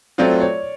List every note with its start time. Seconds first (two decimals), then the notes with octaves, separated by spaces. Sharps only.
0.18 F#3 A3 C4 F4 D5
0.41 C#5